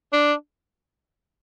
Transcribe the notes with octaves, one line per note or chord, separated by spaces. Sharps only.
D4